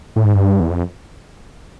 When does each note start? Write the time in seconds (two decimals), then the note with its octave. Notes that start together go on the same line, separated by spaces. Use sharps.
0.16 A2
0.24 G#2
0.34 G2
0.60 E2
0.70 F2